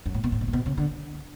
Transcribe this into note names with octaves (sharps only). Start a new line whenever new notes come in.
F#2
A2
B2
A2
B2
A2
B2
C#3
D3